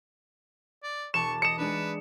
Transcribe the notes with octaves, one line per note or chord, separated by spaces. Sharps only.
D5
E1 A5 C#6 D6 E7
D#5 C#7 E7
G#3 D4 D#4 B4